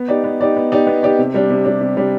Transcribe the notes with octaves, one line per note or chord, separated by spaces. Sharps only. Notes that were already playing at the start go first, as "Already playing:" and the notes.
Already playing: B3
D#4 G4 D5
B3
D#4 G4 D5
B3
D#4 G4 D5
B3
D#4 G4 D5
C3
G3 D4
C3
G3 D4
C3
G3 D4